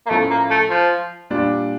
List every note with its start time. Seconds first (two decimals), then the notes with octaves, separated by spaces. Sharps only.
0.06 A#3
0.10 A2 F3 A3 C#4 E4
0.30 A#3
0.51 A3
0.70 F3
1.30 A#2 G3 D4